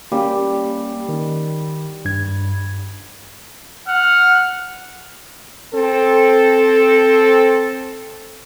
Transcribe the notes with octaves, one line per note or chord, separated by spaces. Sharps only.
G3 A#3 C#4 G4
D#3
G2 G#6
F#5 F6
C4 A4